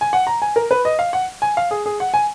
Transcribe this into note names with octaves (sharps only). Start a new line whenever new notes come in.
G#5
F#5
A#5
G#5
A#4
B4
D#5
F5
F#5
G#5
F5
G#4
G#4
F#5
G#5